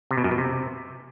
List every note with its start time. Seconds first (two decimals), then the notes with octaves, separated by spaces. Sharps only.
0.11 C3
0.17 B2
0.24 F#2
0.31 B2
0.38 C3